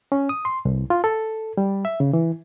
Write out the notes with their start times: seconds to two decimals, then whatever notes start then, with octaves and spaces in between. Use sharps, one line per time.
0.12 C#4
0.29 D#6
0.45 C6
0.65 C2
0.90 F4
1.04 A4
1.57 G3
1.85 E5
2.00 C#3
2.13 E3